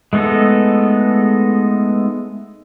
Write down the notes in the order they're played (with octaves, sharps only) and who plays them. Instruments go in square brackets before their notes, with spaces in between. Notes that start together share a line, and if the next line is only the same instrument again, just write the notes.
[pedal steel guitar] G#3 A3 B3 D#4 A4